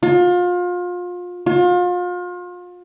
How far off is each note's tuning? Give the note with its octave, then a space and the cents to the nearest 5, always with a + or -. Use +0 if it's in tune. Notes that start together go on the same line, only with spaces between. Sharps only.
F4 +30
F4 +35